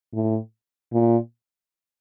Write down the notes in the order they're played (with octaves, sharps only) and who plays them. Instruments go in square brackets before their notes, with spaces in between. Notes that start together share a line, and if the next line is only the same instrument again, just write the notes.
[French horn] A2
A#2